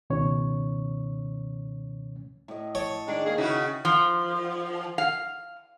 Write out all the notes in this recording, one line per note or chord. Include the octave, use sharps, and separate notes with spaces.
C#2 B2 D#3 C#4 C#5
A2 D#5
C#5 A5
D#3 G#3 D4
A#3 G#4
C#3 D#4 E4 F#4
F3
F5